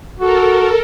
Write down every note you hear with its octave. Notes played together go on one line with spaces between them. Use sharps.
F#4 A4 A#4